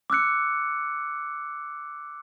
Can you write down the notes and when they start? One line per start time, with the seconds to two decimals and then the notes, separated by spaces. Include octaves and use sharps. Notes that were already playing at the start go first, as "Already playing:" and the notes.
0.10 D6 E6 F#6 C#7